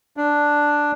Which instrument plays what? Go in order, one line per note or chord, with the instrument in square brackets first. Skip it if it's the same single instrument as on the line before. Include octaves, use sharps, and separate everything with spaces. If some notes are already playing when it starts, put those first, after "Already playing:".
[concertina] D4